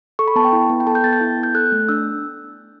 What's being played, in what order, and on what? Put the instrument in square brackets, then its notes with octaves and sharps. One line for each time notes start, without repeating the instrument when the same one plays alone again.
[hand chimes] A4 C#6
B5
B3 A5
G5
E4
B3
G5
A4 A5
G6
B3 A6
G6
E4
B3
G6
A4 F#6
A3
D4 E6